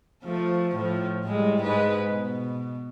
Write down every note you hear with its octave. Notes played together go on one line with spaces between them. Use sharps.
F3 A3
A2 F3
A2 G3 G#3
G#2 G#3 B4
B2